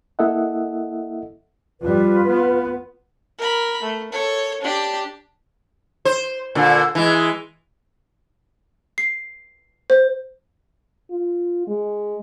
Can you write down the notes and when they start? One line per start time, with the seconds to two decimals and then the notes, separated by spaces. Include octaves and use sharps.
0.19 A#3 E4 A4 D#5 E5 F#5
1.81 F2 G3 F4 B4
2.28 B3
3.39 A#4 B5
3.82 A3
4.12 A4 C#5
4.61 D4 G4
6.05 C5
6.55 A#2 D3
6.95 E3 G#3
8.98 C7
9.90 C5
11.11 F4
11.67 G#3